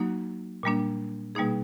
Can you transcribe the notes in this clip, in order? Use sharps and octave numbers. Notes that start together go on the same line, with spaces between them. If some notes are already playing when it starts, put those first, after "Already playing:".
Already playing: F#3 A#3 D#4 F#4
A#2 G3 A#3 D4
B2 G3 A#3 D#4 G#4